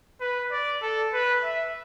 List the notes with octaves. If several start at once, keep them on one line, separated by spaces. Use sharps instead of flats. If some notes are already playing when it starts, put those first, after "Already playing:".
B4
D5
A4
B4
E5